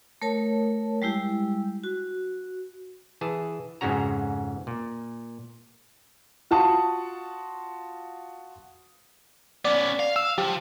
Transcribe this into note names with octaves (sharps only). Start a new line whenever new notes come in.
A3 A#4 C#5 A5
G3 G#3 E4 G4
F#4
E3 G#4 A5
F2 G#2 C#3 C#4 F#4 A#5
A#2
F4 F#4 F#5 A5 C#6 D#6
B3 C#4 D5
F5
F5 E6
F3 G4